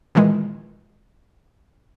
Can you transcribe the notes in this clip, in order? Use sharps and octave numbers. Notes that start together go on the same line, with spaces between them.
A#2 D#3 E3 G#3